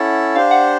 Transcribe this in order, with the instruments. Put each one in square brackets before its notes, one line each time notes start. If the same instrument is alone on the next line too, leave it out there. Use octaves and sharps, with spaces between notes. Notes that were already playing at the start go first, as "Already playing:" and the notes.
Already playing: [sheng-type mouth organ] C#4 E4 A4 [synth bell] F#5
[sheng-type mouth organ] D4 G4 C5 [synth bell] F5
[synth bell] F#5